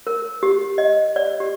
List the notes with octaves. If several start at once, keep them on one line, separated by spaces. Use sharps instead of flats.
A#4
G4
D#5
D5
G4